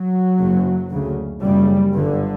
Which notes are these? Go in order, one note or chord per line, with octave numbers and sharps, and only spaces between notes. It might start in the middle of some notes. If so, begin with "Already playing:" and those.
Already playing: F#3
F#1 F#2 C#3
D2 C#3
F#1 F#2 C#3 G3
G1 G2 D3